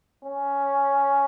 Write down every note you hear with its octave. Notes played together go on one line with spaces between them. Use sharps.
C#4